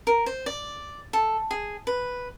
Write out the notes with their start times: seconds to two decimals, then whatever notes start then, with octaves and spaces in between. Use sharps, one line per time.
0.07 A#4
0.26 C5
0.46 D5
1.13 A4
1.51 G#4
1.87 B4